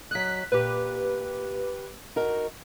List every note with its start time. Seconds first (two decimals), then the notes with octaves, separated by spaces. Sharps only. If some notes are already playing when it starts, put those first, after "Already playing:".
0.11 F#3 D#5 F#6 B6
0.52 A#2 G4 B4
2.16 D#4 F#4 A#4